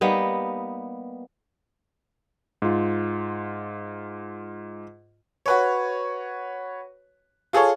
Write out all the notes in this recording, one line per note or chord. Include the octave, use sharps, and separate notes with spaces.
G3 A#3 B3 D#4
G#2 F4
F#4 B4 C#5
F4 G#4 A4 C#5